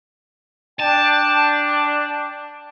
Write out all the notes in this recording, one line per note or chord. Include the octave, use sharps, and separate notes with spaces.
D4 G5 A5